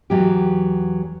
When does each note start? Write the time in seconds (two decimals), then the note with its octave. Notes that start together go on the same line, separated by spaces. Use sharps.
0.10 E2 F#3 G4